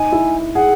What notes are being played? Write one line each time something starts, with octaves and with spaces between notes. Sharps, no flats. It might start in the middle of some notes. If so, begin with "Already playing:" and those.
Already playing: D#4 G#5
E4
G#4 F#5